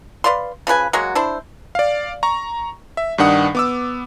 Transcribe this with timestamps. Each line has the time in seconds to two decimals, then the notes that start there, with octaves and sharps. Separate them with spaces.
0.24 B4 D5 F5 C6
0.67 C#3 F3 B4 G#5
0.93 F#3 G#3 A#3 F#4
1.15 D4 E4 C5
1.75 D5 F5
2.23 A#5 C#6
2.97 E5
3.18 G2 D#3 D4 F#5 D#6
3.55 B3 D6 E6